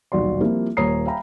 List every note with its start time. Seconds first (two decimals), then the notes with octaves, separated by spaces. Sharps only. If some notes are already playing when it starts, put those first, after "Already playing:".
0.12 D#1 B1 F#4 D5 C6
0.40 F3 G3 A#3 C4 E4 F4
0.77 D#1 A#3 C#5 A#5 D#6 C7
1.05 E5 F5 G5 G#5 A#5 B5